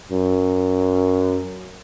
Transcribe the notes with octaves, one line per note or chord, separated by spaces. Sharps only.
F#2